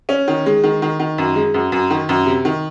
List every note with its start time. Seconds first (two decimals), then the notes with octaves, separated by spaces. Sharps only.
0.09 C#4
0.28 D#3
0.46 G#3
0.63 D#3
0.82 D#3
0.99 D#3
1.18 F#2
1.36 G#3
1.54 F#2
1.72 F#2
1.90 D#3
2.09 F#2
2.26 C3
2.45 D#3